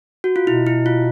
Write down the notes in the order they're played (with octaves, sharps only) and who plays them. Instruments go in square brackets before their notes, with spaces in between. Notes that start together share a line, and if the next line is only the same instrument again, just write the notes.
[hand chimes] F#4
F4
[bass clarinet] B2 [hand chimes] E4
[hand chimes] E4
F4